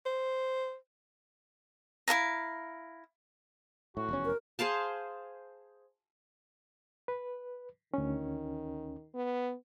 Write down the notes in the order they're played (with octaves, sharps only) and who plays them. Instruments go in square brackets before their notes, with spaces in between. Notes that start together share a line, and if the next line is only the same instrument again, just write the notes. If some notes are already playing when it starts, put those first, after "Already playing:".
[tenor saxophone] C5
[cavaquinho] E4 A4 F5 A#5
[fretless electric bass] A2 [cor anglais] F#4
[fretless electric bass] F1 E2 C#4
[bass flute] A#4
[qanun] G#4 C5 F5 A5
[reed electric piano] B4
[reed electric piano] D2 C#4 [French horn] D#3
[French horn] B3